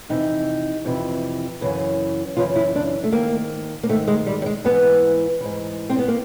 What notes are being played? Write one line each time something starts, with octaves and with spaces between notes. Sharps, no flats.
F2 C3 E3 D#4
F2 C3 E3
F#2 C#3 E3
F#2 C#3 E3 F4
E4
D4
A3
G#2 D#3 A#3
A#3
G#2 D#3 A3
G#3
G3
G3
G#3
G#2 E3 B3
G#2 E3
C4
B3
A#3